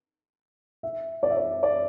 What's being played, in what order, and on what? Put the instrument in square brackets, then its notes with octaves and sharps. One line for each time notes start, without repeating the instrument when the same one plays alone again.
[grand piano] E5
D5
E5
D5
D5